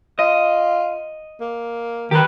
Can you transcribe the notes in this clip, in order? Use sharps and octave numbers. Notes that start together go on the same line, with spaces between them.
F4 D#5
A#3
D#3 G4 B4